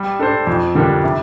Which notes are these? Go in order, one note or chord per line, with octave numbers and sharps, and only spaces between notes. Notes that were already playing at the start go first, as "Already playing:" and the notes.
Already playing: G3
D4 A4 C5
F2
D3 G3 A#3 D4
C3